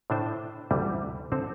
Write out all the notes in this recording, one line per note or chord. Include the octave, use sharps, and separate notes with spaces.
A2 A3 D4 C5
D2 C3 E3 G3
D3 C4 A4 C5